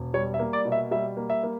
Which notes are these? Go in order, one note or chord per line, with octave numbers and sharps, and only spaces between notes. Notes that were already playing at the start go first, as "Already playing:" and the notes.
Already playing: E1
G3 C#5
E5
A#3
D5
B2
E5
G3 E5
A#3
E5
A#3